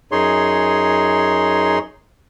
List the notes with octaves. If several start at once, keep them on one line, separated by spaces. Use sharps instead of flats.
F#2 D#4 G#4 C#5 C6